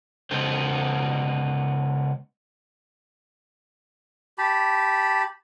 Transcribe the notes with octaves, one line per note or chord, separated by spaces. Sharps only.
C#3 G#3 B3 C#4 C5
G4 A5 B5